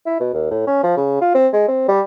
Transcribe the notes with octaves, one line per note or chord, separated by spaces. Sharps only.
E4
B2
D#2
A2
C#4
F3
C#3
F4
C4
G#3
C4
G3